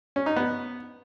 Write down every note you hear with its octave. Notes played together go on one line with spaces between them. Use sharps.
C#4
D#4
B3